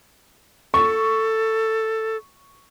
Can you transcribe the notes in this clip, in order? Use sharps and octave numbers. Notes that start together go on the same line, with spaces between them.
A4 C#6